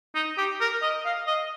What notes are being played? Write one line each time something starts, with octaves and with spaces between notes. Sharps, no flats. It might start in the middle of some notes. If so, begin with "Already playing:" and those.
D#4
G4
A#4
D#5
F5
D#5